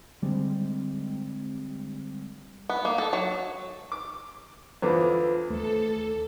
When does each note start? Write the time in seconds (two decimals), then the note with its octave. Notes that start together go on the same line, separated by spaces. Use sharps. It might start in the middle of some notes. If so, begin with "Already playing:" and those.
0.22 D3 G3 G#3 C4
2.70 B3
2.85 A#3
2.98 A4
3.13 F#3
3.92 D6
4.82 E2 D3 F4 B4 C5
5.50 D#2 A3 A4